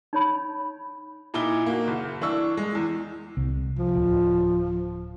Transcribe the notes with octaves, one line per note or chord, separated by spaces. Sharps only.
D#4 C#5 B5
A#2 D#4 E4 G7
A#3 F#4
F#1
E3 D4 C#6 E6
G#3
E2
C2
F3
D1